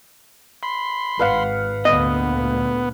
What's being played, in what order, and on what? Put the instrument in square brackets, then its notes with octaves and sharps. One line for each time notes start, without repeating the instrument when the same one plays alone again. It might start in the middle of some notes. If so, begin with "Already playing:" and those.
[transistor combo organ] B5 C6
[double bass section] G#1 [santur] B4 F5 F#5
[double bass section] D2 A#2 D3 [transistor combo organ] B3 [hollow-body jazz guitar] D#5